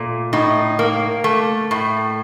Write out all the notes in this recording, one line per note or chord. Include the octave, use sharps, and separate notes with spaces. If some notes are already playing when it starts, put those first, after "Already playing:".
Already playing: A#2 A3
A2 D#4
A#3
A3
A2